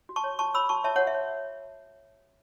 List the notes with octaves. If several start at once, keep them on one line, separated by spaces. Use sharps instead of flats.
F#4
A5 C#6
C#5
F#4 A5 C#6
C#5 B5 E6
F#4 A5 C#6
C#5 E5 A5
C#5 F#5
F#4
E5
C#5